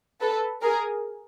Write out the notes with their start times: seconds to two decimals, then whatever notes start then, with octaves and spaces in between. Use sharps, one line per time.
0.21 A4 B4
0.62 G#4 A#4